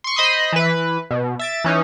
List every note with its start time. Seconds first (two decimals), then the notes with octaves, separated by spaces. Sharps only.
0.04 C6 C#6
0.16 C5 D#5 B5 C6 D#6
0.52 E3 B4
1.11 B2
1.39 E5 A6 D7
1.64 E3 C#4 D#4